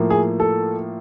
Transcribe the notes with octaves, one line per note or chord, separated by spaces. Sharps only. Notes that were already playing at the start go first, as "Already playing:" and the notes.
Already playing: A2 F3 A#3
G#4
A4